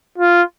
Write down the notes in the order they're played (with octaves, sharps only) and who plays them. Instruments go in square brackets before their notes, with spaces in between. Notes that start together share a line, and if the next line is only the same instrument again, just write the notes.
[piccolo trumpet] F4